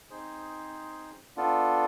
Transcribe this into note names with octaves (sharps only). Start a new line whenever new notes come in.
C4 D#4 G#4 C5
B3 D4 F4 A4